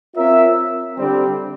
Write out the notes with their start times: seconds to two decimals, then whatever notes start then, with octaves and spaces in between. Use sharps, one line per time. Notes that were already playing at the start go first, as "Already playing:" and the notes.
0.15 C4 F4 A#4 C#5 E5
0.96 D3 G3 C4